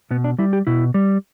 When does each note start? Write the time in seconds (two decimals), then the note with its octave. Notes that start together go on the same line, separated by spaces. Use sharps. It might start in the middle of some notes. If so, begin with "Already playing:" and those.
0.11 B2 B3
0.24 D4
0.39 G3 E4
0.53 G4
0.67 B2 E4
0.94 G3